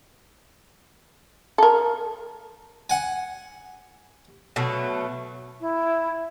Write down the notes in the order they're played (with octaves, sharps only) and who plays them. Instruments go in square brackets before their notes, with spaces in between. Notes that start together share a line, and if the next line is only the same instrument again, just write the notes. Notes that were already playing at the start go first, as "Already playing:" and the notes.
[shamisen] A4 A#4
[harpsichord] F#5 G#5
[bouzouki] B2 F#3 A3
[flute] E4